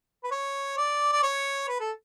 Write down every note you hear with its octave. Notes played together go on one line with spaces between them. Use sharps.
B4
C#5
D5
D5
C#5
B4
A4